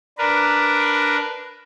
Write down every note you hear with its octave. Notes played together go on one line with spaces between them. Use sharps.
D4 A#4 B4